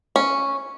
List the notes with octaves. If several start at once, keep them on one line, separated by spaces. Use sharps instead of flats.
C#4